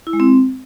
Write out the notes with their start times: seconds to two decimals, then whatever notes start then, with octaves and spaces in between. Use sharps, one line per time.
0.07 E4
0.13 G#3
0.20 C4